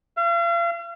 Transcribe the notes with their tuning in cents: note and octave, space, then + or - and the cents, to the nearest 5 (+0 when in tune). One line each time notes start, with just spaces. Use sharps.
F5 -40